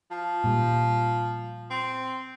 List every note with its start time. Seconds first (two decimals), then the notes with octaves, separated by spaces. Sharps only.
0.11 F3
0.44 A#2 G3
1.70 C4